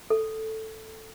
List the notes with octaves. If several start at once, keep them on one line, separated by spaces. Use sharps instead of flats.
A4